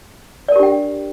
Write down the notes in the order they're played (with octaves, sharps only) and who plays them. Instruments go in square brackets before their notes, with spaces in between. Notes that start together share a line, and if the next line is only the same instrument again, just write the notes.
[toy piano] D5
A#4
G4
D4
G5